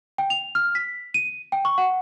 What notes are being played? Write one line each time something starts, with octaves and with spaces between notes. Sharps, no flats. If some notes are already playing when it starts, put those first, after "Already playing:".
G5
F7
F6
B6
D#7
G5
C#6
F#5